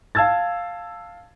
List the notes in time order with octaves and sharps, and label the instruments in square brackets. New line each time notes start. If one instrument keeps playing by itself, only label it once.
[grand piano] F5 A5 E6 G#6 A6